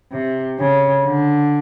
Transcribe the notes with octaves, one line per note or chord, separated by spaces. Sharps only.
C3
C#3
D3